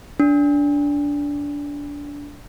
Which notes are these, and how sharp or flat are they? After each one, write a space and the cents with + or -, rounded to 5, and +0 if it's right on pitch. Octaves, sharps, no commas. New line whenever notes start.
D4 -20